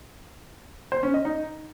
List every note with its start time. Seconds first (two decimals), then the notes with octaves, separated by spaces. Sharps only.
0.92 C5
1.03 C#4
1.14 D#5
1.25 D#4